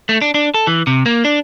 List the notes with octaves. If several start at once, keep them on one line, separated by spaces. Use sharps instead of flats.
A3
D4
D4
A4
E3
C3
A#3
D4